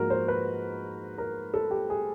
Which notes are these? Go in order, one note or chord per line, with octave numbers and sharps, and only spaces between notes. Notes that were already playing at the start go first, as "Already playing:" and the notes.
Already playing: G#2 F3 A#3 F#4 A#4
C5
B4
A#4
A4
G4
G#4